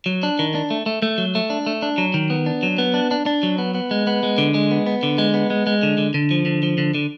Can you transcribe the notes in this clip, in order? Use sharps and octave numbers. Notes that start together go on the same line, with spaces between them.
F#3
D4
D#3
D4
A3
A3
A3
F#3
A3
D4
A3
D4
F#3
D#3
B3
D4
F#3
B3
D4
D4
D4
F#3
B3
B3
G#3
B3
G#3
D3
G#3
B3
B3
D3
G#3
B3
G#3
G#3
D3
D3
D3
F3
D3
F3
D3
D3